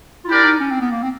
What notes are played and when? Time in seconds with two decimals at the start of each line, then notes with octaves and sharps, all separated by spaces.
0.24 F4
0.28 D4 E4 G4 A#4 D5
0.44 D#4
0.60 C#4
0.71 C4
0.81 B3
0.91 A#3
1.03 C4